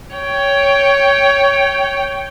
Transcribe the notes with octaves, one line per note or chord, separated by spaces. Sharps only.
C#5 G5